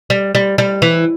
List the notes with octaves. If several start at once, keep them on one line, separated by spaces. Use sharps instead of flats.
G3
G3
G3
E3